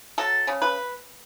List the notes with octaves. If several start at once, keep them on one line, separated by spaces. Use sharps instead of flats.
F#3 A4
C#3
B4